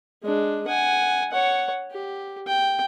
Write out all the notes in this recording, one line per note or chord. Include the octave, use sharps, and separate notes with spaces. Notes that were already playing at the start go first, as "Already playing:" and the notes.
G#3 D4
F#5 G#5
C#5 F#5
G4
G5